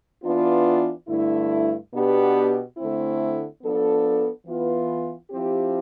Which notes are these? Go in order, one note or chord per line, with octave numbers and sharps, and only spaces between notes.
E3 B3 D4 F4
G2 D3 A3 E4
B2 B3 D4 G4
D3 A3 C4 E4
F3 B3 D4 A4
E3 B3 F4
F3 C4 E4 G4